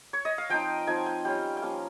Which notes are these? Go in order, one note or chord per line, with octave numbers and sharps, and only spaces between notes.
C#5
D#5
F5
F3 C4 D#4 G5
F3 C4 D#4 G#5
G5
G3 C#4 F4 G5
G5
F3 A#3 C#4 F5